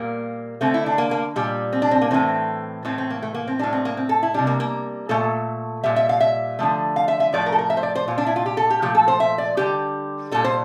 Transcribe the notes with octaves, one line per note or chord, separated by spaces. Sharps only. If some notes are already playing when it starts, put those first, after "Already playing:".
Already playing: A#2 G3 A#3
D3 A3 C4
E4
D4
A#3
A#3
A#2 G3
C4
D4
C4
A#3
A2 E3 A3 C4
A2 E3 A3 C4
C4
A#3
A3
A#3
C4
A2 G3 D4
C4
A#3
C4
A4
E4
C3 G3 D4
A#3
A#3
A#2 A3 A4
A#2 G3 E5
E5
F5
E5
D3 F3 A3
F5
E5
E5
A2 F3 A3 D5
A#4
A4
A#4
E5
C5
D5
C5
A#2 G3 F4
D4
E4
F4
G4
A4
G4
A#2 F3 A3 G4
A4
C5
E5
D5
D3 G3 G4
A#2 G3 A4
C5